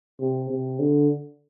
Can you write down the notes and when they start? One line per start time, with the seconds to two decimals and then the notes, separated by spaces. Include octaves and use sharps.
0.20 C3
0.50 C3
0.79 D3